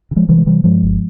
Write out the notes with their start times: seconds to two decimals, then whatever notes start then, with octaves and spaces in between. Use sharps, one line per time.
0.11 C#3
0.16 F3 G#3
0.29 C3 E3 G3
0.38 G#3
0.46 C3 E3 G3
0.64 G2 F3 G#3
0.83 G1